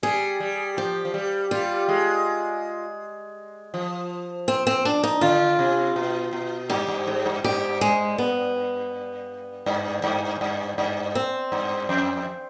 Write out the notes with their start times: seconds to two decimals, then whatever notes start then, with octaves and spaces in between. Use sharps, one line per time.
0.03 G3 G#4
0.40 G3
0.77 F3 G4
1.05 F3
1.14 G3
1.51 G3 F4
1.89 G#3
3.74 F3
4.48 C4
4.67 C4
4.85 D4
5.04 D#4
5.21 D3 F4
5.59 C3
5.96 B2
6.33 B2
6.70 G2 G4
6.88 G2
7.07 G#2
7.26 G2
7.44 G2 G4
7.81 G#3
8.18 B3
9.66 G2
10.04 G2
10.41 G2
10.78 G2
11.15 C4
11.52 G2
11.89 F2